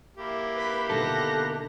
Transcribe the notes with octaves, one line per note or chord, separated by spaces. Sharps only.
A#3 E4 G4
B4 B5
B2 D3 D#3 A4 F#6 A#6